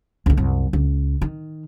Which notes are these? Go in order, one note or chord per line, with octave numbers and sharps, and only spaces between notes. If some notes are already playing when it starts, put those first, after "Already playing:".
C#2 A3
C2 F#2
C#2
D#3